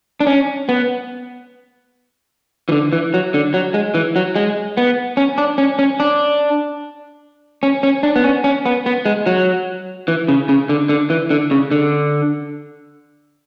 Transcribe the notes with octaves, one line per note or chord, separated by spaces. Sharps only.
D4
C#4
B3
E3
D3
E3
F#3
D3
F#3
G#3
E3
F#3
G#3
B3
C#4
D4
C#4
C#4
D4
C#4
C#4
D4
B3
C#4
C#4
B3
B3
G#3
F#3
E3
C#3
C#3
D3
D3
E3
D3
C#3
D3